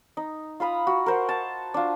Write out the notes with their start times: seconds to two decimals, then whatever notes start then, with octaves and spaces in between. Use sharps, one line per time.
0.17 D#4
0.60 F4 F5 B5 D#6
0.87 F#4
1.06 A#4 C5 F#5
1.29 A5
1.74 D4 F4